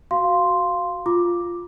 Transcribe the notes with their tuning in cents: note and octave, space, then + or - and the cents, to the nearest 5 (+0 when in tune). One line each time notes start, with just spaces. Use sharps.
F#4 +0 F5 +0 C6 +0
F4 +0 D6 +0